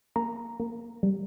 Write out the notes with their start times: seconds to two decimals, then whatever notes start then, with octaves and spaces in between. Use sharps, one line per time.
0.16 A#3 A#5
0.60 A#3
1.03 G3